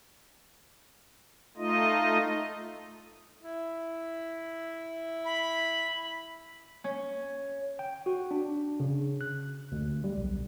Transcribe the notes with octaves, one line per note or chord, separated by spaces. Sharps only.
A3 D#4 F4 D#5
E4
B5
C#4
G5
F#4
D4
C#3
F#6
D2
G3
B1